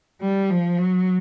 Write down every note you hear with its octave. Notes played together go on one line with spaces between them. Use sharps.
G3
F3
F#3